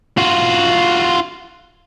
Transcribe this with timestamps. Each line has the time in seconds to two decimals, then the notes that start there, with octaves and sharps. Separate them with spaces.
0.17 F4 F#4